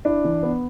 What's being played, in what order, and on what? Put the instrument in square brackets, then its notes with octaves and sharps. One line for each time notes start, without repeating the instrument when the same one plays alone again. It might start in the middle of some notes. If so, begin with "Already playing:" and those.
[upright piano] D4 [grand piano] E4
[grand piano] E3
B3